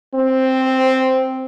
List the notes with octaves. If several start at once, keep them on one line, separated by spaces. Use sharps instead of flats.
C4